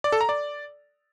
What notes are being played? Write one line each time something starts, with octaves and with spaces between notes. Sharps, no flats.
D5
A4
A#5
D5